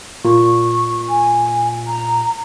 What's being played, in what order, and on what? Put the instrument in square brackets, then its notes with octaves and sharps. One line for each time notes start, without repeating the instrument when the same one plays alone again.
[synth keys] A#2 [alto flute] C#6
[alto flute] G#5
A#5